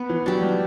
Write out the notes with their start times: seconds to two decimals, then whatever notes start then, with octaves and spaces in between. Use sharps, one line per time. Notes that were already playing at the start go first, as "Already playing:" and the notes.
Already playing: B3
0.09 E3
0.26 F#3 D4 G4
0.43 G3